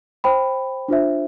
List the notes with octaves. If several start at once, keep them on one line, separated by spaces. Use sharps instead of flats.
C5 G5 B5
D4 F4 C5 E5